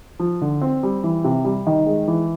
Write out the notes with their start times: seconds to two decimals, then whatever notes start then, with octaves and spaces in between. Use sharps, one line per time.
0.20 F3
0.42 D3
0.62 C4
0.83 G3
1.03 E3
1.24 C3
1.45 G3
1.67 D#3
1.86 G#3
2.08 E3